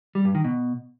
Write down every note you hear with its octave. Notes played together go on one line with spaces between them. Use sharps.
G3
G2
D#3
B2